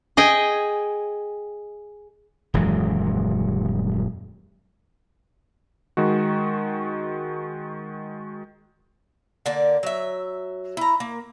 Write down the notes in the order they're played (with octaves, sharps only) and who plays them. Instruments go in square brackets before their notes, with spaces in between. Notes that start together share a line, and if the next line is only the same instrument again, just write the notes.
[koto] G#4 D#5 G5 G#5
[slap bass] D#1 F#2 E3 G#3
[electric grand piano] D#3 G#3 F#4
[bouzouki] D3 A#3 D5
F#3 E5
E4 A#5
A#3